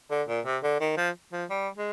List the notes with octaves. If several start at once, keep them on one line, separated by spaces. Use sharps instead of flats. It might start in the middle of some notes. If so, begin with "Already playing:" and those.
D3
A#2
C3
D3
D#3
F3
F3
G3
G#3